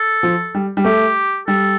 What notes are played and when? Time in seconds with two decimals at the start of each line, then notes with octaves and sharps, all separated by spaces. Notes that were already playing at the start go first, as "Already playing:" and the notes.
Already playing: A4
0.23 F3
0.54 G3
0.77 G3
0.85 A3 G4
1.47 G3 A4